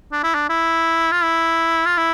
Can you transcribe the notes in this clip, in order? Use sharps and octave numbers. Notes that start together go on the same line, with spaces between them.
D4
E4
D4
E4
F4
E4
F4
E4